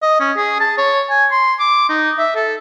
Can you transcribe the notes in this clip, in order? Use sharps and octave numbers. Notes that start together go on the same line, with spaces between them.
D#5
C#4
G#4
A5
C#5
G#5
C6
D6
D#4
E5
A4